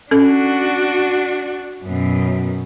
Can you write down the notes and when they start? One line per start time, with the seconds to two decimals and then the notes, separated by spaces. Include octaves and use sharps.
0.11 C#4 D4 F#4 A4
1.85 F#2 B2